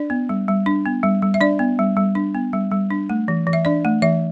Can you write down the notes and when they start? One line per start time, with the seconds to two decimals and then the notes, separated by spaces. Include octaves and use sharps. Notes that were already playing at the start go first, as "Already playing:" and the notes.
Already playing: D4 D5
0.10 B3
0.29 G3
0.48 G3
0.66 D4
0.86 B3
1.03 G3
1.22 G3
1.34 E5
1.41 D4 D5
1.59 B3
1.79 G3
1.97 G3
2.15 D4
2.35 B3
2.53 G3
2.71 G3
2.90 D4
3.09 A3
3.28 E3
3.47 E3
3.53 E5
3.65 D4 D5
3.85 A3
4.02 E3 E5